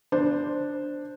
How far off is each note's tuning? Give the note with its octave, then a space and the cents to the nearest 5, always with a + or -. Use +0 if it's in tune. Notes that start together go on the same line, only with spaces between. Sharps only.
D4 +0 C5 +0